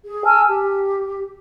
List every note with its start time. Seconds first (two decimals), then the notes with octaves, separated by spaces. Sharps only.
0.05 G#4
0.25 G#5 A5 E6 F6
0.48 G4